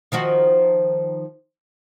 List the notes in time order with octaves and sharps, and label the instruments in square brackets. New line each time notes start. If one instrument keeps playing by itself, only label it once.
[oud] D#3 F3 F#4